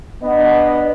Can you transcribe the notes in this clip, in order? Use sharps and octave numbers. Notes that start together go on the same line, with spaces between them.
B3 D4 D#5 F#5